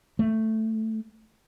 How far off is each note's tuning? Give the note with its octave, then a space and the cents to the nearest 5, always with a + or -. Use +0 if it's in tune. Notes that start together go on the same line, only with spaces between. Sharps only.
A3 +5